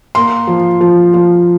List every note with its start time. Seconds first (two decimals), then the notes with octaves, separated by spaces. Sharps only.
0.15 A#3 C6
0.47 F3
0.81 F3
1.14 F3